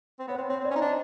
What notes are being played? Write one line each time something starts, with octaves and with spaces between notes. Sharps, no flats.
C4
B3 C#5
C4 C5
C4 C#5
C4
D5
C#4
D#4
D4 D#5